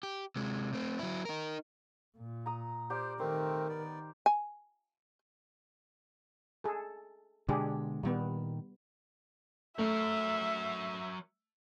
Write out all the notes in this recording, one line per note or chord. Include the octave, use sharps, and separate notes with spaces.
G4
C3 G#3
A3 C4
F#3 E4
D#4 A#4
A#2
A#5 D#6
G4 A#4 C5 D5
D#3 A3 C4 A#4 C5
B3 D5
G#5
G#4 A4
B2 D3 G#3 D4 G4 G#4
A#2 D#3 G3 B3
F#3 A3 A#4 E5